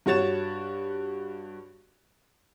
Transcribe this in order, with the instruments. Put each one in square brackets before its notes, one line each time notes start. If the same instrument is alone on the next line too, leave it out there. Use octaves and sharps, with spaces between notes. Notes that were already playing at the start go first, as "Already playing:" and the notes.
[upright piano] G2 F#4 C#5 A6 E7